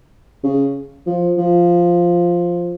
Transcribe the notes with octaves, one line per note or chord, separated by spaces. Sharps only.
C#3
F3
F3